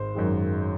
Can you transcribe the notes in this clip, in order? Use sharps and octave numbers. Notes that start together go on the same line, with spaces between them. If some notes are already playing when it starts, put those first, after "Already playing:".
Already playing: G#1 C5
F#2 D#3 G#3